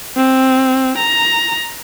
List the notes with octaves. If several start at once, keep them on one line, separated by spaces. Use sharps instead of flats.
C4
A#5